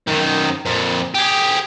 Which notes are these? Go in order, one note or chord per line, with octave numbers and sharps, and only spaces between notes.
F#2 D#3
F2 A#2
G4 G#4